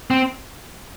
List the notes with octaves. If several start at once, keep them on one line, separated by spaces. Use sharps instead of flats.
C4